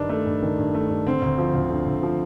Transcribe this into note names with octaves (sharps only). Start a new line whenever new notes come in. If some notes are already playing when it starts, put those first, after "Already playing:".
Already playing: G2 D#3 D4
A3
G2
D#3
G2
A3
G2
D3 C4
D2
F3
D2
D3
D2
F3